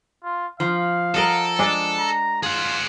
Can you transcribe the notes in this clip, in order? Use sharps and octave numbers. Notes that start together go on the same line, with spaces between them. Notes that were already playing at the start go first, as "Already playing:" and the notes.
F4
F3 F5
A4 A#4 D#5 F#5
G#3 D4
A#5
F4 G#4 F#5